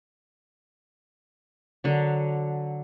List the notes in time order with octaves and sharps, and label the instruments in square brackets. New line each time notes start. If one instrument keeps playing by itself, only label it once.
[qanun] D3 F#3